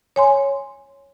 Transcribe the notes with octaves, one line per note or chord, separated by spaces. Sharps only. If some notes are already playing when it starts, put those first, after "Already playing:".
C#5 G#5 C6